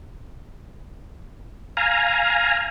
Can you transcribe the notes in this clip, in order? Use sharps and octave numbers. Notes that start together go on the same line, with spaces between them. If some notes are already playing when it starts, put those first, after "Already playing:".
F5 G#5 A#5